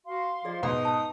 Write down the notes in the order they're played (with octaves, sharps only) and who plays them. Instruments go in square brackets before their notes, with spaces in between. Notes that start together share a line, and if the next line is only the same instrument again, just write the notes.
[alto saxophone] F#4 [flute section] F5 C6
[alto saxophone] F3 [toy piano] G#4 D5 D#5
[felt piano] G#2 B2 C6 [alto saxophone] D#4 [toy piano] B4 D5 F#5 [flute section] D#6
[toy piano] A5